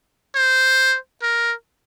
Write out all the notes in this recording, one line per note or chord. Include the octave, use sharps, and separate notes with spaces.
C5
A#4